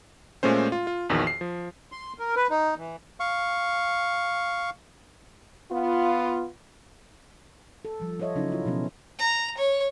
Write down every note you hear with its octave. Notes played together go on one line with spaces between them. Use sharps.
A#2 G#3 A3 C#4 C5
F4
F4
A#1 E2 D#3 F#4
C7
F3
C6
A#4
B4
D#4
E3
F5 C#6
B3 F4
A4
F3 G3
F4 A4 C#5 D#5 E5
C#3 F#3 C#4 D#4 E4
E4 F4
B2 F3 B3 C#4
A#5
C#5